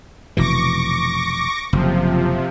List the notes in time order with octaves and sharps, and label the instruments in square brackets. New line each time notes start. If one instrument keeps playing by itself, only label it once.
[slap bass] F1 B2 E3 [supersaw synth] C#6 D6 A#6
[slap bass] F#1 [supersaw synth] C3 F3